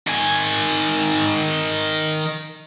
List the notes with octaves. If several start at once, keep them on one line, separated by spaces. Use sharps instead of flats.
D#3 G#5